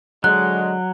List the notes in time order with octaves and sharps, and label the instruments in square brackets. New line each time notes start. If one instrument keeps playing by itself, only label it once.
[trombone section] D3 G#3 [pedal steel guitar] F#3 [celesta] F#6